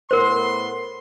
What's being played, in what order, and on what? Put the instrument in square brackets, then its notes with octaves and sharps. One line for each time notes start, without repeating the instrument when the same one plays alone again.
[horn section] A2 B3 C6 [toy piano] A#4 C5